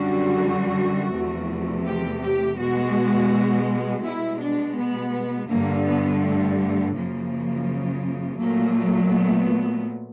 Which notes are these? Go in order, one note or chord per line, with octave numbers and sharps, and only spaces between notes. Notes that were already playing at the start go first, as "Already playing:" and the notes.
Already playing: F#2 D3 G3 F#4
E2 C3 F3 A3
G4
G4
B2 G#3 F#4
B2 G#3 E4
D4
B3
G2 D3 G3 A#3
B3
A3
A3
F#2 C#3 F3 A#3
A#2 F#3 A3 A#3
B3